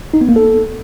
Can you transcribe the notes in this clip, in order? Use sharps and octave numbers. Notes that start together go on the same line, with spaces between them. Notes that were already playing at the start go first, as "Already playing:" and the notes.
D#4
B3
A#3
A4